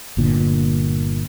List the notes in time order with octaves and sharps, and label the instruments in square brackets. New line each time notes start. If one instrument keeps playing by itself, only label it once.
[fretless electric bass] G1 A#2 D3